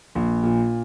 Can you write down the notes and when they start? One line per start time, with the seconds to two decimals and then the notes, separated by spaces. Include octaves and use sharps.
0.15 A#1
0.43 A#2